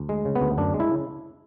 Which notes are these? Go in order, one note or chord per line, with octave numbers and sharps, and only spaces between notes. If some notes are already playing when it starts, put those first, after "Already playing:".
Already playing: D2
G#3
C#3
B3
D2
F#2 D4
G#3
E4
C#3